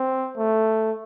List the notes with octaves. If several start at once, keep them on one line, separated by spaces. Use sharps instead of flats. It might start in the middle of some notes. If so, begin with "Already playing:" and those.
Already playing: C4
A3